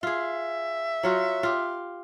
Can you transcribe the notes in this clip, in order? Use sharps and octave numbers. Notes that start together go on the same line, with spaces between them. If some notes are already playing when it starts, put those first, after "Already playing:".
F4 G#4 E5
F#3 F4 F#4
F4 G4